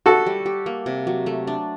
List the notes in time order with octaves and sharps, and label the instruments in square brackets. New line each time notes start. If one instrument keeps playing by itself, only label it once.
[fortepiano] F#4 A4 [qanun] G4
[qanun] G3
G4
A#3
C3
F#3
A3
D4